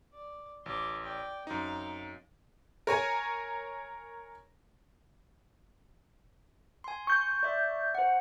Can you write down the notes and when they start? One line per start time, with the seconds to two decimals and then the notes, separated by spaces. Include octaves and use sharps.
0.13 D5
0.66 A1 C6 D6
1.03 D5 G5
1.47 F#2 C4 D#4 F5
2.87 A#4 C#5 G#5
6.84 G#5 C6
7.07 C#6 G6
7.43 D5 E5
7.95 C5 F#5